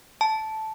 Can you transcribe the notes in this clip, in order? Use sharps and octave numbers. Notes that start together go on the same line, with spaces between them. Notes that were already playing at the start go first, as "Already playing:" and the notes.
A5